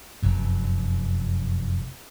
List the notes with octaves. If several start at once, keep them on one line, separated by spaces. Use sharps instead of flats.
F1 F#2